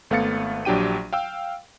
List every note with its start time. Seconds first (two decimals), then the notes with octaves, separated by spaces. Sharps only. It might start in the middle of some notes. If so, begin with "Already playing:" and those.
0.10 G#1 A3 B3 F5 A6 C#7
0.65 A#1 F#3 D4 G4 G5 D#7
1.13 F5 G5 E6